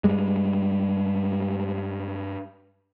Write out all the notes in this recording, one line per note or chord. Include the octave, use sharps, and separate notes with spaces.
G2 G3 G#3